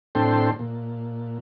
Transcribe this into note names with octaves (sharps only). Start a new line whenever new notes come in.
A2 C4 D4 A4 G5 C6
A#2